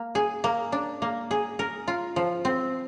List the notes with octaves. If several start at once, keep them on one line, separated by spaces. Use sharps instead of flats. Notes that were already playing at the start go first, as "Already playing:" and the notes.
Already playing: A#3
G#4
A#3
D4
A#3
G#4
A#4
F4
F3
C4